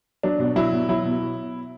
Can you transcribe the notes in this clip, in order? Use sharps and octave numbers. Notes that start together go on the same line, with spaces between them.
F#3 D4
B2
F#3 E4
B2
F#3 E4
B2